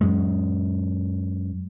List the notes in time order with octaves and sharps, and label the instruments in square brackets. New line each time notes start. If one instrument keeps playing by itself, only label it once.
[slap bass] F#2 G#3